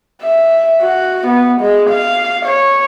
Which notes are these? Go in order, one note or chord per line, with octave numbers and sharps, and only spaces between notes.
E5
F#4
B3
G#3
F5
C#5